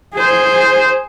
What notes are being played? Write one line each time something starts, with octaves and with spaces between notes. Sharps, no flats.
G#4 C5